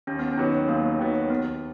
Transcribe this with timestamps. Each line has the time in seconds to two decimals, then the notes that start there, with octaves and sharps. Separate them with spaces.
0.07 D#2 C#4
0.19 B3
0.32 C#4
0.37 D#3 F#3 B3 F#4
0.68 D#2 A#3
0.99 D#3 F#3 B3 F#4
1.30 D#2 B3